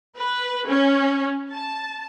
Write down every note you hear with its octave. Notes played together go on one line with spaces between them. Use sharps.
B4
C#4
A5